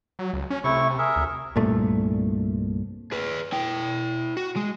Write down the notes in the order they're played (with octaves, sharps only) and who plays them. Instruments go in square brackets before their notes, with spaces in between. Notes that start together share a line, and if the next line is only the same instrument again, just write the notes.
[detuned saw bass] F#3
C#2
C#4
[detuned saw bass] C3 [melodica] A3 E4 C#6
[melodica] G#4 A#4 E5
[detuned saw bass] D2
[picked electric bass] C2 G2 A#2 A3
[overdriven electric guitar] G#4 B4
E4 G5
F#4
G#3